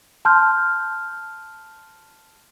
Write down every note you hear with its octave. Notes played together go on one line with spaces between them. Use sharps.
A5 C6 F6 G6